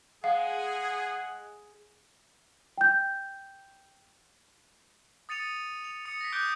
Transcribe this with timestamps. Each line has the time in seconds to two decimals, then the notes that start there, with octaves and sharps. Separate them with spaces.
0.24 G#3 G#4 F5 F#5
2.78 G5 G6
5.29 D#6 A6 C#7 D#7 F7
5.84 F7
6.05 D#6 C#7
6.21 A#6 B6
6.32 D6 D#6 F#6 G6 D7 G7